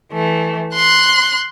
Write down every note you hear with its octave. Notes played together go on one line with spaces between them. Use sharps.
E3 A3
C6 F#6